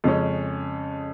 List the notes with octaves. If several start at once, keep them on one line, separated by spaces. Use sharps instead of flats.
F2 C#3 G#3 C#4